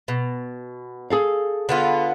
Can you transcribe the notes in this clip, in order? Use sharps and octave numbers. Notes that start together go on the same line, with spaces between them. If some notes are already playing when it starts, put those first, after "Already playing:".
B2
G#4 A4 F5
D3 B3 F4